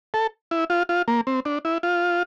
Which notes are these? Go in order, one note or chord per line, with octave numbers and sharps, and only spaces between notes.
A4
E4
F4
F4
A#3
C4
D4
E4
F4